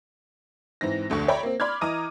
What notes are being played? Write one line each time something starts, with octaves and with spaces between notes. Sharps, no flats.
G#2 E3 C4 A#6
F1 D2 D3 C#6
C#5 D5 E5 G5 A#5 B5
A#3 C4
D5 B5 C6 D6 F6 G#6
E3 D#5 A#5 D6 D#6 D#7